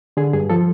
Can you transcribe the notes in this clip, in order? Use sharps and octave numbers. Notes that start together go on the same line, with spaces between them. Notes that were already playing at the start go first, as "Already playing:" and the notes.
D3 G#4
G2 G#4
F3 A4